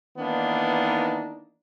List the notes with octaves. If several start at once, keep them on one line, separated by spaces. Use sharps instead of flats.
D#3 E3 A#3 B3 D4 D#4